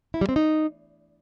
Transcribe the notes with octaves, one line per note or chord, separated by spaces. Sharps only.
E4
G3
C4
D#4